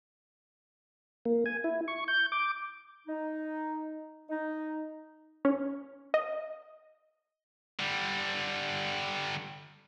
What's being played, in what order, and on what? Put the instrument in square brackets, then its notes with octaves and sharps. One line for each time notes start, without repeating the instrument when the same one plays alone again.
[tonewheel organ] A#3
G#5
E4
C#6
G6
D6
[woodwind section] D#4
D#4
[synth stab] C#4
D#5
[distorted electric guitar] D3 G3